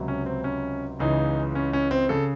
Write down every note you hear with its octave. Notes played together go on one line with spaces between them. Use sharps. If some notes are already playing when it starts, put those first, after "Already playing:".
Already playing: C#2 C3 F#3
C#4
C4
C#4
C#2 C#3 E3 D#4
C#4
C#4
C4
C#3 A4